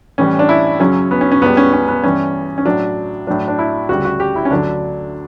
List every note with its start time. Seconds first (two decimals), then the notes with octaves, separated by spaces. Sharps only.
0.18 A2 E3 G3 C#4
0.39 D4
0.49 E4
0.80 F#2 C#3 F#3 C#4
1.11 B3
1.21 C#4
1.32 C#4
1.42 C#2 C#3 G3 B3
1.57 C#4
1.73 C#4
1.88 B3
2.03 G2 E3 G3 C#4
2.58 C#4
2.66 A2 F#3 D4
3.27 A2 F#3 D4
3.48 D4
3.59 E4
3.89 D2 C#3 G3 F#4
4.05 F#4
4.20 G4
4.36 E4
4.45 C#4
4.51 D2 D3 F#3 D4